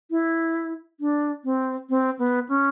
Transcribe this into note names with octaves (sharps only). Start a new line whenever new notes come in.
E4
D4
C4
C4
B3
C#4